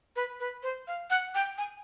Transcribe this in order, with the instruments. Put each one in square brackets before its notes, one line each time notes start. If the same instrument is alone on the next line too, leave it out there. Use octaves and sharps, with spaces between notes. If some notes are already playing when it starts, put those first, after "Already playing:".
[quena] B4
B4
C5
F5
F#5
G5
G#5